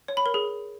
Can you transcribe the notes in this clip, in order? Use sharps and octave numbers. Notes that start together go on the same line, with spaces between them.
C#5
B5
A#4
G#4